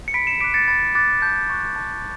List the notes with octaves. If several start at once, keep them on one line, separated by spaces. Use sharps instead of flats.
C#7
B5 B6 D7
C#7 E7
D6 F#6 B6 D7
A6 C#7
B5 A6
D6 F#6 A6
A5 G6
C#6 F#6
A5